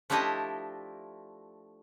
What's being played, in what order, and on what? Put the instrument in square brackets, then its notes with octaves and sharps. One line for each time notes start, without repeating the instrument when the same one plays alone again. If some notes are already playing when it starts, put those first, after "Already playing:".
[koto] F3 A3 D4 E4 G4 D#5